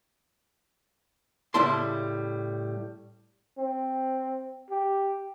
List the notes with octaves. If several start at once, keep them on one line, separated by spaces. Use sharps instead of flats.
A2 C#3 G3 E4 A5 C6
C4
G4